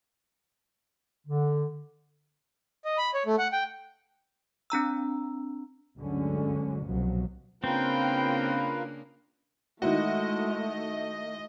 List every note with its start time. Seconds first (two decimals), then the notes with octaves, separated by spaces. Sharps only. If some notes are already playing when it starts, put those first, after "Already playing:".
1.27 D3
2.85 D#5
2.98 B5
3.14 C#5
3.26 A3
3.38 F#5
3.52 G5
4.70 C4 D4 A#5 E6
5.97 D2 G2 D3 F#3 G#3 C#4
6.86 C2 B2 F3 F#3
7.64 C#3 A#3 C4 D4 F4 A#4 B4 G5
9.82 D#3 G#3 A3 E4 F#4 D#5